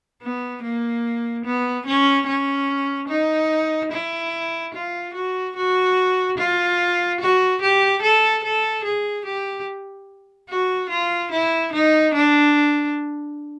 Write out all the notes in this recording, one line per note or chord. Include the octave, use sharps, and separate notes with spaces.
B3
A#3
B3
C#4
C#4
D#4
E4
F4
F#4
F#4
F4
F#4
G4
A4
A4
G#4
G4
F#4
F4
E4
D#4
D4